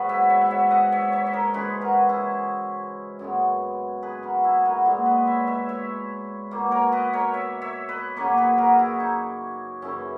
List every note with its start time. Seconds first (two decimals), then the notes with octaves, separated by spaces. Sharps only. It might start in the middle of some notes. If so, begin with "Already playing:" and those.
Already playing: G#2 F#3 B3 B4
0.09 C#5 E5
0.30 C#5 E5
0.41 F#5
0.51 C#5 E5
0.71 D#5 F#5
0.92 C#5 E5
1.12 C#5 E5
1.27 D#5
1.33 A#4 C#5
1.54 C#3 E3 G#3 G#4 B4
1.81 F#4 A#4
2.09 E4 G#4
3.19 F#2 C#3 G#3 B3
4.03 G#4 B4
4.23 F#4 A#4
4.44 E4 G#4
4.59 B4
4.65 F#4 A#4
4.85 A#2 G#3 B3
5.06 B4 D#5
5.27 C#5 E5
5.47 C#5 E5
5.69 C#5 E5
6.51 B2 A#3
6.71 A#4 C#5
6.92 B4 D#5
7.13 A#4 C#5
7.34 C#5 E5
7.61 C#5 E5
7.89 B4 D#5
8.16 F#2 C#3 F#3 A#3 A#4 C#5
8.37 G#4 B4
8.58 F#4 A#4
8.79 E4 G#4
9.00 D#4
9.82 F#2 C#3 E3 C#4 E4